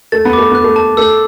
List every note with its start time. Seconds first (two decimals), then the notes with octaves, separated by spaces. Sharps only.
0.12 A3 A6
0.25 B3
0.33 A3 D6
0.52 B3 F#6
0.64 A3
0.76 A5
0.97 A3 E6